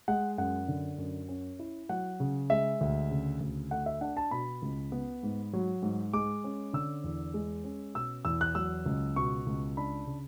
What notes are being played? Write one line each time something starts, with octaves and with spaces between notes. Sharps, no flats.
G#3 F#5
F#2 F#5
D3
F#2
C#4
E4
F#3 F#5
C#3
G#3 E5
D2
C#3
D2
A3 F#5
E5
D4 F#5
A5
B2 B5
C#2
B3
G#2
F#3
G#2
G#3 D6
C#4
D3 E6
E2
G#3
C#4
B2 E6
E2 E6
F#6
F#3 E6
C#2
B2 C#6
C#2
D4 B5
C#3